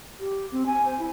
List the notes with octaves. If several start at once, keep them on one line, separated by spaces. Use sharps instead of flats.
G4
C4
G#5
C5
E4